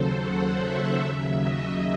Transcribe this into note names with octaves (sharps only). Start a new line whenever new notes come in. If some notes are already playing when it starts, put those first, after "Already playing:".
Already playing: D#2 C#3 F#3 A4 C5
F#5
E5
D#2 C#3 F#3 E5
D#5